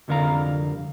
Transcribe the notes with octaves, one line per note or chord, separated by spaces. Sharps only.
C2 F2 D3 A#4 F5 A#5